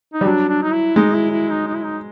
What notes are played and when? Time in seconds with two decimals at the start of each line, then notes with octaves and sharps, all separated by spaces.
0.14 D#4
0.21 G3
0.26 F#3 D4
0.49 D4
0.63 D#4
0.73 E4
0.96 G#3 D#4
1.14 E4
1.31 E4
1.50 D#4
1.67 D#4
1.75 E4
1.84 D#4